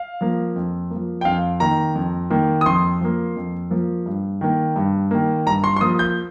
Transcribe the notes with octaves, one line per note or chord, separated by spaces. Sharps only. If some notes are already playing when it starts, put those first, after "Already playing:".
Already playing: F5
F3 A#3
F2
F3 A#3
G5
F2 F5
D#3 A#3 A#5
F2
D#3 A#3
D#6
F2 C6
F3 A#3
F2
F3 A#3
G2
D#3 A#3
G2
D#3 A#3
G2 A#5
C6
C6
F3 A#3 D#6
G6